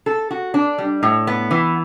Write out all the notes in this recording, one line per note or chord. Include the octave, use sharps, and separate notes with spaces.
A4
F#4
D4
G3
A2
B3
E3